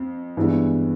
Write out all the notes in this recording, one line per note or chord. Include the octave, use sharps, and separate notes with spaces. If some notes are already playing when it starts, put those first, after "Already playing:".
Already playing: F2
G2 E3 G#3 B3